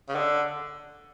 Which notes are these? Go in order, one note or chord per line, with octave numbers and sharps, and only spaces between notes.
C#3
D3